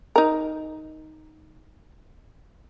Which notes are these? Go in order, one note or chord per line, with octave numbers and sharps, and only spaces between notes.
D#4 A#4